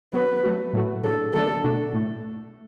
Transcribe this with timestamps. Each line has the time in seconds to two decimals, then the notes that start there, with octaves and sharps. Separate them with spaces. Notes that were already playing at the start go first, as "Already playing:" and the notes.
0.13 F#3 B3 F#4 B4
0.44 F#3 A3 F#4
0.73 A2 F#3 A3 F#4
1.03 A2 F#3 D4 A4
1.33 D3 F#3 A3 D4 A4
1.64 B2 A3 D4 F#4
1.93 A2 A3